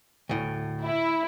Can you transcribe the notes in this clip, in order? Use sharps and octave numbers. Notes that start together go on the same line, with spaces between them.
D2 A2
E4